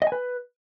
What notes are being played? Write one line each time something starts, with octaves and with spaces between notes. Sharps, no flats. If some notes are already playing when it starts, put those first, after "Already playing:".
D#5
G#5
B4